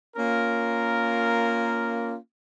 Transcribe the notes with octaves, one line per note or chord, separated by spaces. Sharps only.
A#3 C#4 F4 A#4